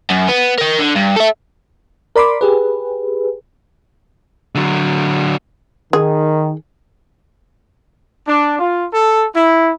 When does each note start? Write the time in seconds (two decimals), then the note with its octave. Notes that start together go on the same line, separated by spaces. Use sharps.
0.10 F#2
0.28 B3
0.58 A#4 G5
0.79 D3
0.96 G2
1.16 A4 E5
2.16 A#4 D5 B5 C6 D6
2.41 G4 G#4 B4
4.55 D3 F#3
5.93 D#3 G#4
8.28 D4
8.58 F4
8.92 A4
9.35 E4